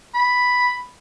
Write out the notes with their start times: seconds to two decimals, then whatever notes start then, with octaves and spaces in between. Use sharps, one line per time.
0.14 B5